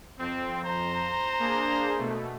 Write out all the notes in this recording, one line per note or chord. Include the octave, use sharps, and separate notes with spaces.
F2 C4
C5 A#5
A#3 D4 G#4
B2 A3